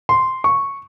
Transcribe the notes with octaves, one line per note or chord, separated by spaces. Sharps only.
C6
C#6